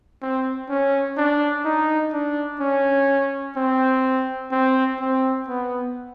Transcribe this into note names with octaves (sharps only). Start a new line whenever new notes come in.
C4
C#4
D4
D#4
D4
C#4
C4
C4
C4
B3